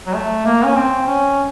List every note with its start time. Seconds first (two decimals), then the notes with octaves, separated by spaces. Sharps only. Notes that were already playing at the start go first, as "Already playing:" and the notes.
0.07 F#3
0.14 A3
0.46 A#3
0.65 C#4
0.76 C4
1.07 C#4